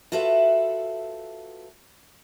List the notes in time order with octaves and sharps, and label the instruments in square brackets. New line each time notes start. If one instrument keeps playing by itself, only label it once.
[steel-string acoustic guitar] F4 F#4 A4 B4 E5